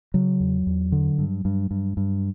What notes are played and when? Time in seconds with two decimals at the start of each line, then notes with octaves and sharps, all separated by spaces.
0.14 C#3 F#3
0.40 E2
0.67 E2
0.92 D3
1.19 G2
1.45 G2
1.71 G2
1.97 G2